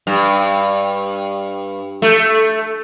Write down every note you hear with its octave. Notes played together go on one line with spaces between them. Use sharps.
G2
A3